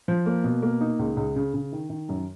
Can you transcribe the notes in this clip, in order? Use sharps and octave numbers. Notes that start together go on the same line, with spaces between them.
F3
A#3
B2
A#3
D#4
C#2
C#2
C#3
C#3
D#3
D#3
F#2